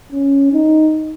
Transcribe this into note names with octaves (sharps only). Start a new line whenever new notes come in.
C#4
D#4